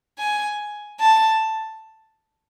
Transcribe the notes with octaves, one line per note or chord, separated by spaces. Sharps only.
G#5
A5